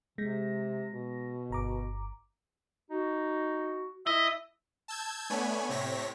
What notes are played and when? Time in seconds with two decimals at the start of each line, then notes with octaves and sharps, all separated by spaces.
0.18 C3 G#3 A#6
0.90 B2
1.50 G1 A#5 D6
2.90 D#4 F#4
4.07 E4 D#5 E5
4.88 A5 E6 G6 G#6
5.30 A3 B3 D4 C#5 G#5 B5
5.69 A2 C3 C4 C#5 A#6 B6